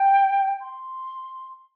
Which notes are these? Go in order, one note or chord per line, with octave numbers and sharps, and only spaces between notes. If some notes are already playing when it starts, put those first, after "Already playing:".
Already playing: G5
C6